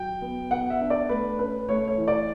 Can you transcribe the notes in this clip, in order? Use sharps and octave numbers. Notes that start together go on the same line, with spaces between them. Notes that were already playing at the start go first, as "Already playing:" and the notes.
Already playing: F#3 G5
B3
B3 F#5
E5
D4
D5
A3 B4
C#4 B4
A3 C#5
C#5
E3
D5